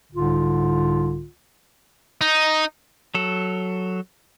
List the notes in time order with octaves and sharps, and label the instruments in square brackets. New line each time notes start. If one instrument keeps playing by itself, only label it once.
[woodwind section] C2 G#2 D3 F4
[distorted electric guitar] D#4
[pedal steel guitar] F#3 A4